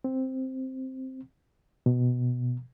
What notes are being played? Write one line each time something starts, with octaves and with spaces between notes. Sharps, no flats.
C4
B2